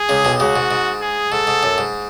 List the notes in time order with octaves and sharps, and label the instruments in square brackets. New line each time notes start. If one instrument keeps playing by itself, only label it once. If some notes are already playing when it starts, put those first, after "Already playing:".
Already playing: [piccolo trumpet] G#4
[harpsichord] C#2 C#3
B1 B2
[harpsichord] C#2 C#3 [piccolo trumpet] F#4
[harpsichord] G#2
G#2
[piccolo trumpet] G#4
[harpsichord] G#2 [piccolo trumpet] A4
[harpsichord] G#2
F#2
G#2